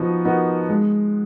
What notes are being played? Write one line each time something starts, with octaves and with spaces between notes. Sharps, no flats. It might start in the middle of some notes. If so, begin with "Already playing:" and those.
Already playing: F3 B3 D#4 F#4
B3 D#4 F#4 A#4
G#3